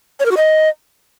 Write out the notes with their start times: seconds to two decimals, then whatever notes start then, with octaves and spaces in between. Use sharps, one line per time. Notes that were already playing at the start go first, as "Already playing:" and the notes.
0.20 C#5
0.25 A#4
0.31 F#4
0.37 D#5